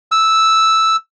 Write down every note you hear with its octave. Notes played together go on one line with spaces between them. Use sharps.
E6